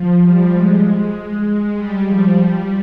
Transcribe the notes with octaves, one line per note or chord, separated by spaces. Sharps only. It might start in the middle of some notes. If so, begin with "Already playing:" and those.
Already playing: F3
G3
G#3
G#3
G3
F3
G3